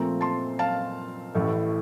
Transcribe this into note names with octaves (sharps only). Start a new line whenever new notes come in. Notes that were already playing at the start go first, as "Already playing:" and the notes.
Already playing: A#2 F3 A3 C4 A#5
A5 C6
F5 A5
A1 A2 A3